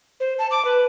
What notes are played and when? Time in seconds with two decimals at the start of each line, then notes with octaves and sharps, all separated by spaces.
0.20 C5
0.39 A5
0.51 D6
0.65 B4